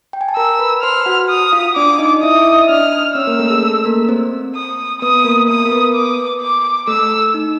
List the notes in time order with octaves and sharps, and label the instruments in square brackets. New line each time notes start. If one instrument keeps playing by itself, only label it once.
[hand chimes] G5
G#5
A5
[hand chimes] A#4 A#5 [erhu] E6
[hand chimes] B4 B5
[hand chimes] C5 C6 [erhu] F6
[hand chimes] F#4 F#5
[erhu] D#6
[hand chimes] F4 F5
[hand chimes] D4 D5 [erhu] D6
[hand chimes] D#4 D#5
[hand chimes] E4 E5 [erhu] D#6
[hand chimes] E5
D#5
[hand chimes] D4 D5 [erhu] F6
[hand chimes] C#4 C#5 [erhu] E6
[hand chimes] A#3 A#4
A3 A4
G#4
A3 A4
A#3 A#4
C4 C5
[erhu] D#6
[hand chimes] B3 B4 [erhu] D#6
[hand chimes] A#3 A#4
[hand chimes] B3 B4 [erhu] D#6
[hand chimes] A#4
B3 B4
[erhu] D6
D6
[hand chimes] A3 A4 [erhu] E6
[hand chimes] D#4